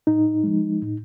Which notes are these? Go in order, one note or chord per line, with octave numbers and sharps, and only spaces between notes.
A2 D#4
F3 G#3
A2